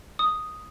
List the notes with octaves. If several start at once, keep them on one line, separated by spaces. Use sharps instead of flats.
D#6